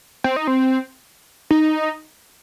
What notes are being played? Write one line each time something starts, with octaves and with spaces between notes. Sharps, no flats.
C4
D#4
C4
D#4